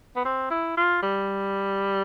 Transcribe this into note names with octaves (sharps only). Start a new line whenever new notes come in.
B3
C4
E4
F4
G3